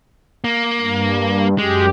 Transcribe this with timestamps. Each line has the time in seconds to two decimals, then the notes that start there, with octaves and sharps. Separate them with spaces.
0.44 A#3
0.80 G2
1.58 F#2 G#3 G4